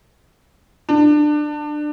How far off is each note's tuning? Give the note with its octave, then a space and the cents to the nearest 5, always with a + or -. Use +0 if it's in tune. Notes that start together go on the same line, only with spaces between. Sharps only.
D4 +25